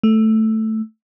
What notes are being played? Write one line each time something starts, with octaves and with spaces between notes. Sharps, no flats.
A3